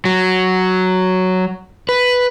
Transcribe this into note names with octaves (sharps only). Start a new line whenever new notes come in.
F#3
B4